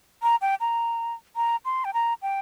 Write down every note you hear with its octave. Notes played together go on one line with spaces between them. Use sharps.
A#5
G5
A#5
A#5
C6
G5
A#5
G5